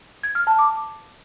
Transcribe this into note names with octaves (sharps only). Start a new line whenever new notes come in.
G#6
F6
A5
D6